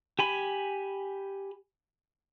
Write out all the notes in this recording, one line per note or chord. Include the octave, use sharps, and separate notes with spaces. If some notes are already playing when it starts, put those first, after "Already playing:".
G4 G#5 B5